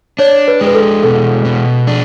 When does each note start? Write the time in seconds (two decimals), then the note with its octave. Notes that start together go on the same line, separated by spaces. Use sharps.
0.19 D4 C#5
0.48 B4
0.61 G#3
0.67 B4
0.74 A4
1.03 B2 A4
1.45 B2
1.87 D4